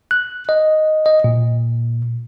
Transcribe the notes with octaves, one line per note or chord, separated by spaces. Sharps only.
F#6
D#5
D#5
A#2